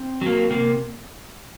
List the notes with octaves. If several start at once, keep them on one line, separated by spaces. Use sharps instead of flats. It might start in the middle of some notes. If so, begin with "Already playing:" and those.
Already playing: C4
F#3 A#3
C3 A#3